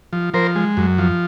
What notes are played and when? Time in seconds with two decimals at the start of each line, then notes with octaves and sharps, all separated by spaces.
0.13 F3
0.34 F3 A#4 C5
0.56 G#3
0.77 F#2
0.98 F3